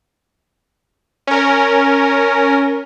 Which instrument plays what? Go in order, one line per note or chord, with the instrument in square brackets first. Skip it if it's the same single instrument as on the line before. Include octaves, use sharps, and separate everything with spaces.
[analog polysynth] C#4 A#4